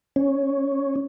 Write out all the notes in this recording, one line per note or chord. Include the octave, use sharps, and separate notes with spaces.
C#4